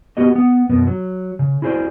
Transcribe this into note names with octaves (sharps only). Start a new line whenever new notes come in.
B3 F#4 G4 D#5
B3 F#5
F#2 B2 B3
F#3
C#3
E4 F#4 G#4 A#4 C5 D5